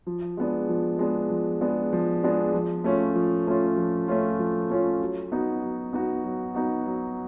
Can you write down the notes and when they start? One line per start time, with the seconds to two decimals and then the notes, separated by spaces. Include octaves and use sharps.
0.07 F3
0.37 G#3 B3 D4
0.69 F3
0.99 G#3 B3 D4
1.30 F3
1.61 G#3 B3 D4
1.93 F3
2.23 G#3 B3 D4
2.54 F3
2.84 A3 C#4 F4
3.15 F3
3.47 A3 C#4 F4
3.77 F3
4.08 A3 C#4 F4
4.39 F3
4.70 A3 C#4 F4
5.01 F#3
5.32 B3 D#4 F#4
5.63 F#3
5.93 B3 D#4 F#4
6.24 F#3
6.55 B3 D#4 F#4
6.86 F#3